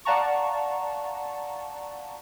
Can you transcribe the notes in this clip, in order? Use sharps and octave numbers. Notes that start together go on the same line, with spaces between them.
D5 F5 F#5 A5 A#5 C#6